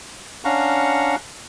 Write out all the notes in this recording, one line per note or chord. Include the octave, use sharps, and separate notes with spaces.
C#4 D4 F5 F#5 A#5 C#6